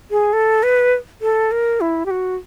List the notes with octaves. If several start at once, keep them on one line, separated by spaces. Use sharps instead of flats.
G#4
A4
B4
A4
A#4
E4
G4
F#4